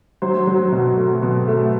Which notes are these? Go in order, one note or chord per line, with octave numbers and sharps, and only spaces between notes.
F#3 C5
F#3
B2
A3
B2
A3